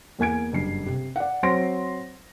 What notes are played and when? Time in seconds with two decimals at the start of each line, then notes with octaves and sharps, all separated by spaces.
0.19 E2 A#3 G#5 G#6 D7
0.53 F#1 G2 C7
0.86 C3
1.16 D5 F#5
1.43 F#3 C4 C5 C6 A#6 D7